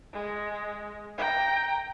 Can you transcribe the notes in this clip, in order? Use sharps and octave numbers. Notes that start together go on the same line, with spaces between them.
G#3
G5 A#5